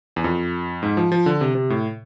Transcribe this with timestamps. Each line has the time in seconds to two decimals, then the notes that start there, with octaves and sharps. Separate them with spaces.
0.16 E2
0.24 F2
0.83 G#2
0.97 F3
1.12 F3
1.26 D3
1.41 C3
1.55 C3
1.70 A2